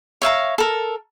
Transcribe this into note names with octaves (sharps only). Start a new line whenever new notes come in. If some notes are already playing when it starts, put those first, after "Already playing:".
C#5 E5 F5 A#5
A4 A#4